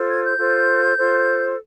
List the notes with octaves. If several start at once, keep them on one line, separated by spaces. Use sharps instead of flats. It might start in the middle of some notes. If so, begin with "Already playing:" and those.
Already playing: F4 A4 C5
G#6
G6
F4 A4 C5
F4 A4 C5